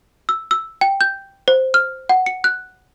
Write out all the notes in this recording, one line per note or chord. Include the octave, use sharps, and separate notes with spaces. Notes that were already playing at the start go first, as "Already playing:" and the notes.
E6
E6
G5
G6
C5
F6
F#5
C#7
F#6